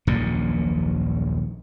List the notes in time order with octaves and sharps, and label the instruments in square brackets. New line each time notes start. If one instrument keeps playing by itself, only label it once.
[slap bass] D#1 A#1 F#2 A#2